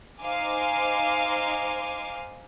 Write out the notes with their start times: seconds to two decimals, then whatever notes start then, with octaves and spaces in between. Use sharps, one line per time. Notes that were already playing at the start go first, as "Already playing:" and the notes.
0.22 D#4 C5 F5 G#5 D6